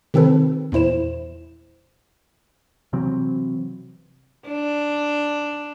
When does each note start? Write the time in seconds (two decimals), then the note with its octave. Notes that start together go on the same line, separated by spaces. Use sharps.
0.14 C3 D#3 C4 A4 B4
0.72 E2 A#2 E4 C5 E7
2.93 C3 E3 F#3 C4
4.48 D4